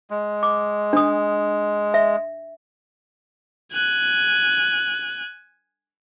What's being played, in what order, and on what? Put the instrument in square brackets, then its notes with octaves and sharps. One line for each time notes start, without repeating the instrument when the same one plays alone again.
[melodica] G#3
[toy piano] D6
D4 D#6
E5
[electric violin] G#5 F#6